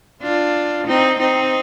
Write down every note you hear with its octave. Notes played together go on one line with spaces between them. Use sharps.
D4 F4
C4 D#4
C4 D#4